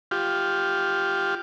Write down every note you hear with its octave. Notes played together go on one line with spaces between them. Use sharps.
F4 G4